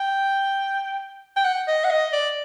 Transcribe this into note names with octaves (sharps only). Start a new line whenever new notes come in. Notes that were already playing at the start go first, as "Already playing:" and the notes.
Already playing: G5
G5
F#5
D#5
F#5
D#5
D5